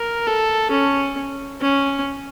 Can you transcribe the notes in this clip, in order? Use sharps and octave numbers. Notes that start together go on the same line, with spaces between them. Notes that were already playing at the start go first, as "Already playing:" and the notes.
Already playing: A#4
A4
C#4
C#4